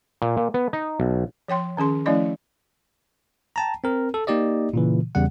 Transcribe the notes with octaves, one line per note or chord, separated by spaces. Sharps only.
A#2
A#2
B3
D#4
B1
F3 C#5 G5 C6
D#3 C#4 G#4 C6
F3 A3 C#4 E4 D5 D#5
G5 A5 A#5
C4 A#4
A4
A#3 D#4 G4 D5 D#5
A#2 C#3 E3
E2 C#3 G3 F#5